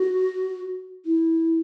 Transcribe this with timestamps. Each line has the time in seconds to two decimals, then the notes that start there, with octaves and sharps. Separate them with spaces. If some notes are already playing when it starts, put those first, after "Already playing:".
Already playing: F#4
1.06 E4